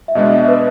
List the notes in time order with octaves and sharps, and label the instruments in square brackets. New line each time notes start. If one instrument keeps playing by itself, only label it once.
[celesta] E5
[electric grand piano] B2 G#3 B3 D4 [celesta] D#5
[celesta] E5
B4